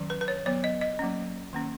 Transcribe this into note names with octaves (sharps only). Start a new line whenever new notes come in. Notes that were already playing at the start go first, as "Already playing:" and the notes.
Already playing: D#3 F#3 C#4
B4
B4
C#5
F#3 B3 C#5
D#5
D#5
F#3 A#3 C#4
D#3 A#3 C#4